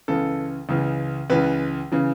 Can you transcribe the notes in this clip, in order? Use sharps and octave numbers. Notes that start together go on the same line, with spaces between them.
C#2 C#3 E3 A4
C#2 C#3 E3
C#2 C#3 E3 B4
C#3 E3